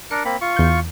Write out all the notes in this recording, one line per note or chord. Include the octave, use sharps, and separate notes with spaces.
D4 A#4 C#7
A#3 C4 B5
F4 C#6
E2 G6